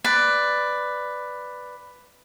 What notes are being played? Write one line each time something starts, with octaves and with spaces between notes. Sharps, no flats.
B4 D5